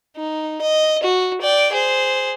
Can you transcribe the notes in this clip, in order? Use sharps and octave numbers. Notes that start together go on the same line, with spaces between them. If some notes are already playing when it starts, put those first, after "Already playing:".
D#4
D#5
F#4
D5 G5
G#4 C5